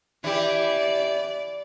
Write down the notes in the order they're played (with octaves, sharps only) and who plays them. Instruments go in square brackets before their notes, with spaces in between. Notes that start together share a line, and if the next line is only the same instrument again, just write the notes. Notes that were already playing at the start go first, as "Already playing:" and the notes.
[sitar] E3 G4 [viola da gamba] D5